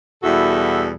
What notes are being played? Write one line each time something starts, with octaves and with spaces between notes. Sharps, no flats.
E2 B2 G3 E4 F#4 A4